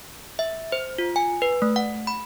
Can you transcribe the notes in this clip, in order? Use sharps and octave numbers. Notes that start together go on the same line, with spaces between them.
E5
C5
F4
G#5
B4
A3
F#5
B5